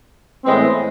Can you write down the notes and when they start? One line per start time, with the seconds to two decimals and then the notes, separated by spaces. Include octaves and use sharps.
0.45 A2 E3 G#3 B3 C4